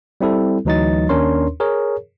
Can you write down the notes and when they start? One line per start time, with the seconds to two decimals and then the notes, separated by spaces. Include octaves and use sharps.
0.21 G3 C4 E4 A4
0.65 D2 E3 F#3 D#4 D#5 A6
1.09 D#2 C#4 D4 A#4 C#5 C6
1.60 G#4 A#4 C#5